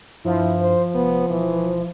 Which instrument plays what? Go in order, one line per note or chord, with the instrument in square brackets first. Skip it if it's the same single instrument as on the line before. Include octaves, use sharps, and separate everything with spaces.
[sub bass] G2 [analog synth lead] F3 [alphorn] E4
[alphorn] C5
[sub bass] F1 [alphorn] B3
[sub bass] E1 [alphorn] E3